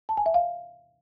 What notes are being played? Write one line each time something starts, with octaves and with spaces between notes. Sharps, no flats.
A5
G#5
E5
F5